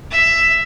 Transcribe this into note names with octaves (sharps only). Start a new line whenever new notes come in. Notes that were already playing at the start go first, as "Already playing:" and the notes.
E5